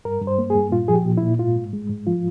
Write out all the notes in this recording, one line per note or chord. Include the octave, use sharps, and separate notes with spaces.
G2 A#4
G2
C5
A#3
G#4
G2
A#2 F4
F3 G#4
G4
A#2
A#2 E4
G#2 F4
G#2
G#3
G#2
F3 F4